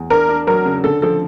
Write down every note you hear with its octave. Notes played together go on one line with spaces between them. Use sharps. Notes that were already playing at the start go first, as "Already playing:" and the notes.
Already playing: E2
D4 A#4
D4
F#3 A#4
C#3
D3 A4
F3 A4